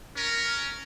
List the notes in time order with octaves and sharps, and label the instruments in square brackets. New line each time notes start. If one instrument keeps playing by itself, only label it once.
[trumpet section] C#4 A#4